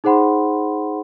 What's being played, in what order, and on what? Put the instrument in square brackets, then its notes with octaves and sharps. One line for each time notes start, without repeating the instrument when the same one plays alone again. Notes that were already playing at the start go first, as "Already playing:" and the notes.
[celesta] D#4 G#4 C5 F#5 B5 C6